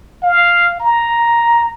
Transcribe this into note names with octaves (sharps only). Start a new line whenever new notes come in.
F5
A#5